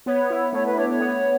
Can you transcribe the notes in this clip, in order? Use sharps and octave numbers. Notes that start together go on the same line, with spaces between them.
B3 C#5
E4
A3 C#5
B4
D4 C#5
C#5
B3